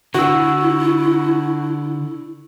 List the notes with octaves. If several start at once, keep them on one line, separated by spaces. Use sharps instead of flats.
D3 E4 F#4 C#6 E6